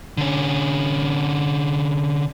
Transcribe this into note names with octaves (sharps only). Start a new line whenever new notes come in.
D3 C#4